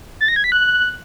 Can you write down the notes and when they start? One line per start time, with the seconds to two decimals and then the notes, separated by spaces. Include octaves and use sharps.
0.21 A6
0.28 A#6
0.36 G#6
0.44 B6
0.52 F#6